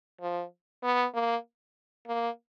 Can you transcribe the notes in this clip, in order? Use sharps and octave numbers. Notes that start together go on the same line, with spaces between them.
F3
B3
A#3
A#3